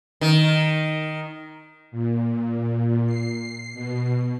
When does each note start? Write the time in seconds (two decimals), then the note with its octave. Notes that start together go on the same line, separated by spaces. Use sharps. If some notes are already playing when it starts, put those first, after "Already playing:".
0.21 D#3
1.91 A#2
3.06 C7
3.74 B2